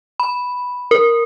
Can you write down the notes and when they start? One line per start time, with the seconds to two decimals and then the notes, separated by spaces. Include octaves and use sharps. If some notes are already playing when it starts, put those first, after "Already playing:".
0.20 B5
0.91 A#4